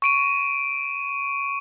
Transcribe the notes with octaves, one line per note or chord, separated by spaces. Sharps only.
C#6 D7 D#7